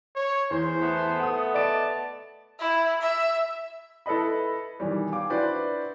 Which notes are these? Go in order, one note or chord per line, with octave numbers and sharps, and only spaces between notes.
C#5
E2 C5
A3 B3
F#5 D#6
D5 A5 D7
E4
E5
E4 A4 B4 D#5 B5
B2 D#3 E3 G3
F5 G5 G#5 D6
D4 E4 F#4 B4 C5 D5